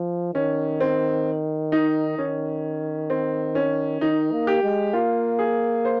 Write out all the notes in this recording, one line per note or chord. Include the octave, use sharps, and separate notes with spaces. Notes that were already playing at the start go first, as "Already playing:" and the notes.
Already playing: F3
D#3 C#4
C4
D#4
D#3 C#4
C4
C#4
D#3 D#4
A#3
G4
G#3
A#3 F4
G#4
C5